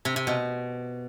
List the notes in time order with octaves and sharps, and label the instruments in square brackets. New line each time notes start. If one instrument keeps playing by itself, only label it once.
[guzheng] C3
C3
B2